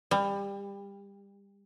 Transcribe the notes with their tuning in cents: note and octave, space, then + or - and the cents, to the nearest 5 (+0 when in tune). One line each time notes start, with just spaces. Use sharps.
G3 +25